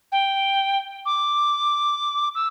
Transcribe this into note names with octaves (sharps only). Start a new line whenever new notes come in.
G5
D6
E6